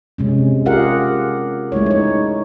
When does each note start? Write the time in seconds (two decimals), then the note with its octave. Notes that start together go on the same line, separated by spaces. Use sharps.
0.18 C3 G#3 C#4
0.66 F4 G4 G#4 A#4 F5 F#5
1.72 G#3 A3 E4 C#5
1.86 D#4 C#5